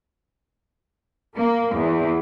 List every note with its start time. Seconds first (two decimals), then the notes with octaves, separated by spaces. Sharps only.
1.35 A#3
1.73 E2